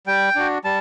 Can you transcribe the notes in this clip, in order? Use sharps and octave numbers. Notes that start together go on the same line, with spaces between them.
G3 G5
D4 F#4
G3 A5